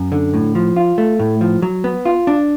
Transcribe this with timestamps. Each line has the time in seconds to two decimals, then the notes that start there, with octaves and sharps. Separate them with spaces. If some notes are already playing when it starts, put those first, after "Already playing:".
Already playing: F#2
0.12 D3
0.34 A2
0.55 F3
0.77 F4
0.98 A3
1.20 A2
1.41 F3
1.62 F#3
1.84 B3
2.05 F4
2.27 D4